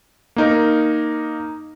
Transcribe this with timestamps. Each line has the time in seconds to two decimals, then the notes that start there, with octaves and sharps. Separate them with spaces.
0.36 A#3 D#4 A#4